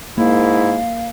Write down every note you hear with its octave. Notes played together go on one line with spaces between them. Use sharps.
G#2 A#3 E4 F5